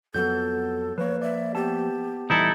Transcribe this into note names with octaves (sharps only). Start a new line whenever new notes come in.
F2 F#3 B3 A4 G6
F3 A#3 B4 C#5
D5 E5
B3 G4 A5
D#1 E3 G3 D#4 E4 A4